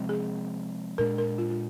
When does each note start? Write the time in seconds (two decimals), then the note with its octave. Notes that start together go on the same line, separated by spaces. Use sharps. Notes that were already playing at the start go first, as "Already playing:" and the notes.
Already playing: C3 F3 G#3 C4
0.09 G#4
0.98 A#2 G#3 D4 A#4
1.18 A#4
1.38 F4
1.50 F4